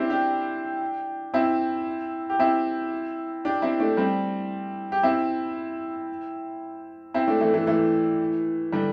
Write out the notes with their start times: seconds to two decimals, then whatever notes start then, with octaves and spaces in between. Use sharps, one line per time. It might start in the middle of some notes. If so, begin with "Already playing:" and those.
Already playing: C4 D4 E4 G4
0.10 D4 G4
1.34 C4 E4
2.30 G4
2.39 C4 E4
3.45 D4 G4
3.62 C4 E4
3.80 A3 D4
3.97 G3 C4
4.92 G4
5.03 C4 E4
7.14 C4 E4
7.28 A3 D4
7.40 E3 A3
7.54 E3 A3
7.67 E3 A3
8.72 D3 G3